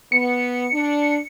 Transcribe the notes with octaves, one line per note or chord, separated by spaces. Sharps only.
B3 C#7
D4